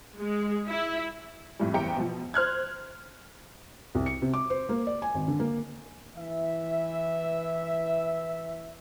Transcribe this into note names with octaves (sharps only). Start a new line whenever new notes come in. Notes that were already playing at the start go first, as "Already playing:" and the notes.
G#3
E4
F2 A2 G3
F#1 E2 G4 G5 A#5 C#7
B2 F3
C5 F6 F#6 G#6
C2
C#7
C3
D6
C5
A#3
D5
G#5
G#1
D3
A#3
E3 E5